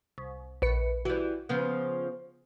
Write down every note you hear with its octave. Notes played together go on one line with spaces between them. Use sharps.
C2
A#1 B4 C#7
E3 G3 F#4
C#3 F3 B3